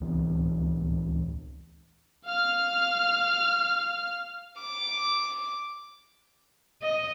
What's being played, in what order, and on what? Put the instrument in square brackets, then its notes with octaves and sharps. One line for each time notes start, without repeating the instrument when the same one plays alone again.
[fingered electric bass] D1 C#2 E3 B3
[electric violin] F5 F6
[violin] D6
[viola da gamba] D#5